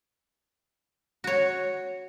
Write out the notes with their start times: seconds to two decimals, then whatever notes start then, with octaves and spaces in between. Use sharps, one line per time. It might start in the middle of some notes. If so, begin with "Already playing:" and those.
1.24 F#4 C#5